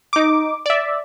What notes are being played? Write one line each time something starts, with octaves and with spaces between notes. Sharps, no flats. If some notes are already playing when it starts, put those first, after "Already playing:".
D#4 D6
D5 E5